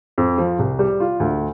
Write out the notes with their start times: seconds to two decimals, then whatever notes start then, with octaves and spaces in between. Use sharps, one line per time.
0.18 F2
0.38 F3
0.59 C2
0.79 G3
1.00 F4
1.20 D2